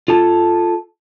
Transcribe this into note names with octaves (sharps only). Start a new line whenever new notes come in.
F4 A4 A5